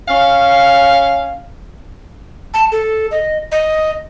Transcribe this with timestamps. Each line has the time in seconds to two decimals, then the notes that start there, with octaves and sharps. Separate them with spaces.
0.09 C#4 F5
2.54 A5
2.72 A4
3.11 D#5
3.52 D#5